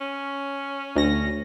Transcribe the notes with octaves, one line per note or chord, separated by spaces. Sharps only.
C#4
D2 A#6